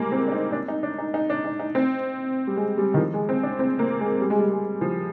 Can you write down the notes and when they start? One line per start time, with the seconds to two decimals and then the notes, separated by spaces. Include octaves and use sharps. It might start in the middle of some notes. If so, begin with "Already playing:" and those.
Already playing: G3 G#3 A#3
0.12 C4
0.28 D4
0.32 D#4
0.52 D4
0.68 D#4
0.83 D4
0.99 D#4
1.14 D#4
1.30 D4
1.45 D#4
1.59 D#4
1.75 C4
2.47 G3
2.57 G#3
2.78 G3
2.94 D#3
2.97 F3
3.14 G#3
3.29 C4
3.43 D4
3.59 C4
3.79 A#3
4.00 G#3
4.21 G3
4.30 G#3
4.39 G3
4.51 G#3
4.81 F3